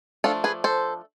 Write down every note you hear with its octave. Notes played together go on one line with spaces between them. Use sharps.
F3 A3 D4 F4 A4
G#4 B4
A4 C5